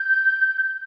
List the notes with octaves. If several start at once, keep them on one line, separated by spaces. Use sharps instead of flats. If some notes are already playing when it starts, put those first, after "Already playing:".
Already playing: G6